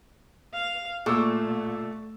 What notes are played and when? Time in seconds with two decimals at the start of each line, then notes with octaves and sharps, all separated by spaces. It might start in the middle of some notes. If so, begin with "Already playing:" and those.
0.54 F5
1.06 A#2 A3 A4 C#6 E6